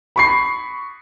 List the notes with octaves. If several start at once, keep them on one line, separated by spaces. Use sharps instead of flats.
B5 C#6 C7